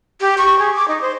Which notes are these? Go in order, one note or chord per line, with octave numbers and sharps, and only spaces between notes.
G4
C#6
G#4
D6
D#4
C5